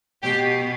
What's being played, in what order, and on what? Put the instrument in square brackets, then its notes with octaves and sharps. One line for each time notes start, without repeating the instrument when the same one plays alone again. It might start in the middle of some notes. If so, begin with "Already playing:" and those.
[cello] B2 [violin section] G4